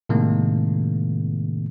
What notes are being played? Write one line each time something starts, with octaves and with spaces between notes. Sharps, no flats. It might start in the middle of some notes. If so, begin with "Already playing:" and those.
A2 C3 D#3 G#3 A#3